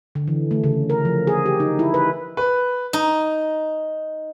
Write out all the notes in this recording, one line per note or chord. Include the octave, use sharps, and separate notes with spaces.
D3
E3
A3
C#3
A#4
F3
G#4
G4
D#4
E4
B4
B4
D#4